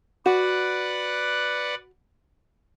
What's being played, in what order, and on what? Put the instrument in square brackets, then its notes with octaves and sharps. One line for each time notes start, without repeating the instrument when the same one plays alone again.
[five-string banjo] F#4 [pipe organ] B4 D5 F#5